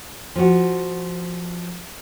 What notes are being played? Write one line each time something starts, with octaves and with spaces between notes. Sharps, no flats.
F3 F#4